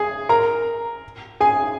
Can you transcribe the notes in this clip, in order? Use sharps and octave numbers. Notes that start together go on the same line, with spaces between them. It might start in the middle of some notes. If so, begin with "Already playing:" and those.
Already playing: G#4 G#5
A#4 A#5
G#4 G#5